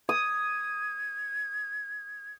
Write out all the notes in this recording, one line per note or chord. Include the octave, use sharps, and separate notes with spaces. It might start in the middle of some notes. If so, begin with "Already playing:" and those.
D#6 G#6